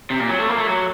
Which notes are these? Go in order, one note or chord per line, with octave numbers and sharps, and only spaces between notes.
C3
A#2
F#3
A3
A#3
A3
F#3